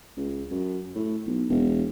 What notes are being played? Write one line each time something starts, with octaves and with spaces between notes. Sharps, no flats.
C#2
F#2
A2
B1
E1